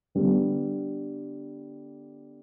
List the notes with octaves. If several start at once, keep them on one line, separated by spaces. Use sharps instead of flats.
D3 G3 B3